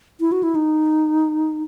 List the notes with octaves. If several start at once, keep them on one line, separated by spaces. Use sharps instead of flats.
E4
F#4
E4
D#4